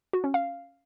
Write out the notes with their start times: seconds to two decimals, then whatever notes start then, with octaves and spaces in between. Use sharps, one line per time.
0.13 F#4
0.24 C#4
0.34 F5